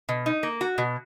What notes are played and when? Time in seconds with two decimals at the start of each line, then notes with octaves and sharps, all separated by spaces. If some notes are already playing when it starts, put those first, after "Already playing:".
0.09 B2
0.26 D#4
0.43 A#3
0.61 F#4
0.78 B2